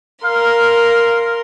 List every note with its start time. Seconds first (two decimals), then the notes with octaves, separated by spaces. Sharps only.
0.24 A#4 F5 A#5 C6